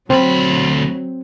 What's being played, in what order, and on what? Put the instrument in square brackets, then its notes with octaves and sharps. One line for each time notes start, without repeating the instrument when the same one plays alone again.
[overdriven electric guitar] D2 B5 [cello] F#3 [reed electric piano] C4